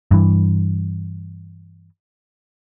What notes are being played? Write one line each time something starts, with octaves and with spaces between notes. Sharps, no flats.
G2 E3